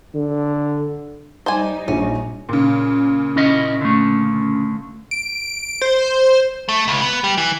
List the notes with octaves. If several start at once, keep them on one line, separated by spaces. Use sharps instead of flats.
D3
G3 D#4 C5 D5 G#5
A#1 C#4
A#2 C#3
C#4 E4 D#5
D3 A3
D7
C5
A3
C#2
B3
G3
E3